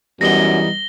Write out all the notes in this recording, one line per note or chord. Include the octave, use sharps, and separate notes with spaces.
F#2 E3 G3 B3 D#4 A#6 G7